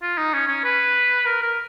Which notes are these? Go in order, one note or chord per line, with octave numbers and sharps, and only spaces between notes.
F4
D#4
C#4
C#4
B4
A#4
A#4